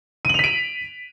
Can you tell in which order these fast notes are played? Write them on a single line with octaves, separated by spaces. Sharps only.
D#7 F#7 F7 B6 D7